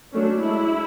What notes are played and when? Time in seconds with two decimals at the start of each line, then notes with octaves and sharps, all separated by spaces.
0.13 F#3 A3 C#4 D4
0.41 G#3 D4 E4